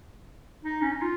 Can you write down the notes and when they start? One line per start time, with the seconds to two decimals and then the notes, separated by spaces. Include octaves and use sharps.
0.65 D#4
0.82 C#4
0.92 D#4
1.02 F4